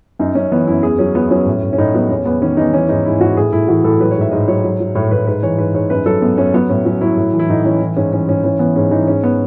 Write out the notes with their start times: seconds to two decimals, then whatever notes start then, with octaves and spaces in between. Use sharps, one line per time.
0.19 F#2 D#4
0.35 F#2 C#4
0.52 E3 B3
0.67 F#2 E4
0.83 E2 G#4
0.99 F#3 C#4
1.15 F#3 B3
1.30 F#3 C#4
1.46 A2
1.63 A2
1.73 C#4
1.78 A2 D#4
1.94 F#3 B3
2.10 E2 C#4
2.25 E2 B3
2.41 D#3 C#4
2.57 E2 D#4
2.73 E3 C#4
2.89 G#2 D#4
3.05 G#2 E4
3.21 G#2 F#4
3.37 A2 G#4
3.53 A2 E4
3.68 E3 F#4
3.84 A2 A4
4.00 F#3 B4
4.11 C#5
4.16 G#2 E5
4.31 G#2 D#5
4.48 F#3 C#5
4.64 F#3
4.80 F#3
4.95 A2 C#5
5.11 A2 B4
5.27 G#2 B4
5.43 E3 C#5
5.58 G#2 B4
5.74 G#2 C#5
5.90 F#2 B4
6.06 F#3 A4
6.22 F#2 B3
6.38 F#2 C#4
6.54 F#3 B3
6.69 A2 C#4
6.85 F#3 C#4
7.01 F#3 E4
7.17 A2
7.33 E3
7.39 E4
7.49 A2 D#4
7.64 E3 C#4
7.81 E3
7.97 G#2 C#4
8.13 E3 C#4
8.28 G#2 C#4
8.44 E3 C#4
8.59 E3 B3
8.76 G#2 C#4
8.91 E3 D#4
9.08 G#2 C#4
9.23 B3